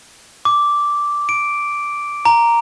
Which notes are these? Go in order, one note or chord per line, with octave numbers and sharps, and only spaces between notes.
D6
D7
A#5